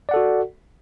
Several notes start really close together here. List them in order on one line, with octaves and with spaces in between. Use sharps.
D5 F#5 A4 F#4